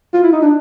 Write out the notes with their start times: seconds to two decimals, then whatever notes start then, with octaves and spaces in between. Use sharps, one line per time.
0.14 F4
0.23 E4
0.32 D#4
0.42 D4